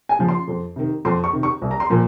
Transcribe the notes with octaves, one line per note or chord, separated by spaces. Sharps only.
G#5
C#3 F3
C6
F2
C3 D#3
F2 C6
C#6
C3 D#3
C#6
C2
A#5
C6
A#2 F3